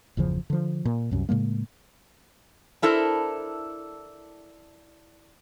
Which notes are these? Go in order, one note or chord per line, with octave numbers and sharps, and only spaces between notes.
G1 E2 C#3 F3
D3 F3
A#2
C2 F#2 C3
A2 C#3 G#3 A#3
D4 E4 A4 A#4 C5